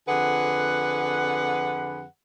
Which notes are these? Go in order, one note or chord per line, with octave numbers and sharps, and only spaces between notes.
F2 D3 G#4 B4 F#5